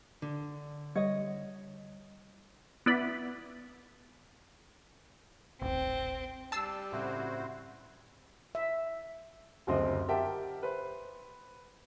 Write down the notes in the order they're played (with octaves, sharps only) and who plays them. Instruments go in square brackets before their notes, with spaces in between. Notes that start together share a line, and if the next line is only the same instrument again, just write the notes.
[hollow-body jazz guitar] D3
[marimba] G3 [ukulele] C#5 D#5
[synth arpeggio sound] B3 E4 D5 B5
[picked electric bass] D#1 A1 [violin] C4
[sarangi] G3 [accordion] D4 [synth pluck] A5 E6 C7
[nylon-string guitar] A2 C#3 C4 [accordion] E4 F#4 C5
[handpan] E5
[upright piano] F#1 D2 C4 C5 D#5
G4 A#4 E5 F#5 G5 A5
B4 C5